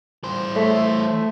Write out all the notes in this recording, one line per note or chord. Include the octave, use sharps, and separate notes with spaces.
E3 C5
A3 C#5 E5 C6